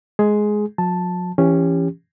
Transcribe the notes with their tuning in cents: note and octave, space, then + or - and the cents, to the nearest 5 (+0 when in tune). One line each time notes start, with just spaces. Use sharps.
G#3 +10 G#4 +10
F#3 -45 A5 +0
E3 +25 C#4 +0 G4 +25